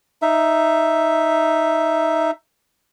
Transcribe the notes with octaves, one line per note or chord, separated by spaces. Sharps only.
D#4 E5